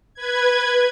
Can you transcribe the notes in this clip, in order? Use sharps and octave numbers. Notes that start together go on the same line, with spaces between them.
B4 G#6